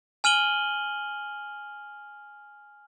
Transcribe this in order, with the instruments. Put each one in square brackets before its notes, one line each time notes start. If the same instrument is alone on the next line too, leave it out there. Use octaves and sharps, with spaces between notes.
[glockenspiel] G#5 F6 D#7 F#7 G7